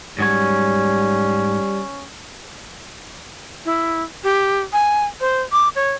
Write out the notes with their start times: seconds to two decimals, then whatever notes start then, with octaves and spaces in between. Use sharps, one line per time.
0.19 G#2 F#3 G3 C#4 C#5
3.65 E4
4.24 G4
4.73 G#5
5.20 C5
5.52 D6
5.76 C#5